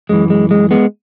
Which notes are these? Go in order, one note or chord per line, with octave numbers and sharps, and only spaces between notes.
F#2 E3 G#3
G#3
G#3
G#3 B3